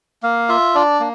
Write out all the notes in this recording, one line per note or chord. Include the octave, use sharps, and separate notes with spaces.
A#3 F5
F4 E5
D4 D5
A#3